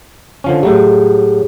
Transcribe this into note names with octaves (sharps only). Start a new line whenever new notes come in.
D3 F3 C#4
A2 F#3 A3 G4 G#4